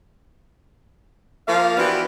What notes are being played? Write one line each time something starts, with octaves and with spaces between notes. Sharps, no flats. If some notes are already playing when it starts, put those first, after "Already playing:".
F3 A#3 F5
E3 B3 D4 F#4 G4